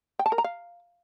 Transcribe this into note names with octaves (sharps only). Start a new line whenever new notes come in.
G5
A5
A#4
A#5
F5